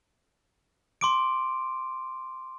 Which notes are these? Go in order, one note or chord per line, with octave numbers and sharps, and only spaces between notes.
C6 D6 D7